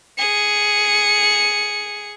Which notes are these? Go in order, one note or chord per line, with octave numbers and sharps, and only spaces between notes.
G#4 C#7